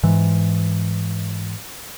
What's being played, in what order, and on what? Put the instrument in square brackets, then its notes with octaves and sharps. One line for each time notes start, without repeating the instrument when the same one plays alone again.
[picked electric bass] G#2 E3